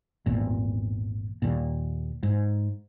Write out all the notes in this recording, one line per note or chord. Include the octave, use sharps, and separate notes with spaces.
G#1 E2 A#2
D#2 A#2
G#2